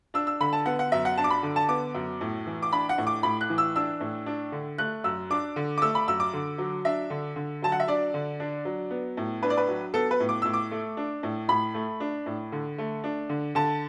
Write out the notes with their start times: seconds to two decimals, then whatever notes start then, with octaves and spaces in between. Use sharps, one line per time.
0.14 D4 E6
0.27 E6
0.40 D3 B5
0.53 A5
0.66 B3 F#5
0.79 F#5
0.92 F#2 E5
1.05 F#5
1.18 D4 A5
1.24 D6
1.30 B5
1.43 D3
1.56 A5
1.68 B3 D6
1.95 F#2
2.21 A2
2.47 E3
2.62 D6
2.72 D4 B5
2.89 F#5
2.98 A2
3.07 D6
3.23 A2 B5
3.41 F#6
3.50 E3
3.58 E6
3.76 D4 E6
4.01 A2
4.26 D4
4.52 D3
4.78 A3 F#6
5.04 F#2 E6
5.30 D4 D6
5.56 D3
5.78 D6
5.82 A3 E6
5.95 B5
6.08 F#2 E6
6.20 D6
6.33 D3
6.58 F#3
6.85 D4 E5
7.10 D3
7.36 D3
7.62 F#3 A5
7.72 F#5
7.80 E5
7.87 D4 D5
8.14 D3
8.40 D4
8.65 F#3
8.90 B3
9.17 A2
9.43 D4 B4
9.50 D5
9.57 B4
9.68 F#3
9.94 B3 A4
10.11 B4
10.20 A2
10.29 D6
10.42 A2 E6
10.53 D6
10.71 A3
10.97 D4
11.23 A2
11.49 A2 B5
11.74 A3
12.00 D4
12.26 A2
12.52 D3
12.78 A3
13.04 D4
13.29 D3
13.55 D3 A5